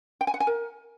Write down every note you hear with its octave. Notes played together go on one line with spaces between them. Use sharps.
G5
G#5
F#5
G#5
A#4